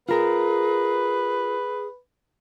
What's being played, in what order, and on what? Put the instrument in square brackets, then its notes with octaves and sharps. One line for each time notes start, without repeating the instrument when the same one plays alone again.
[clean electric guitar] F4 A#4 [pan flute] G#4 [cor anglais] B4